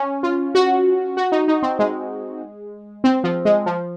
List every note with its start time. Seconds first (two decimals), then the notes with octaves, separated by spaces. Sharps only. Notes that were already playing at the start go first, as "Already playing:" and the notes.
Already playing: C#4
0.23 F4
0.55 F#4
1.17 F#4
1.32 D#4
1.48 D#4
1.63 C4
1.79 G#3
3.04 C4
3.24 F3
3.45 G#3
3.66 F3